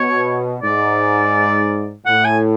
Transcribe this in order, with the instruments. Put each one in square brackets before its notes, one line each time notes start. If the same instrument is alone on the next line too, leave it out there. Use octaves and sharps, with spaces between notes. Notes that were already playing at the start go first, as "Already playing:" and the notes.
Already playing: [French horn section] B2 [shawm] C#5
[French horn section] G#2 [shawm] D5
[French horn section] A2 [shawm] F#5
[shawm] G#5